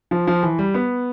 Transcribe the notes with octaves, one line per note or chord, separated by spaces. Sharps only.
F3
F3
E3
G3
B3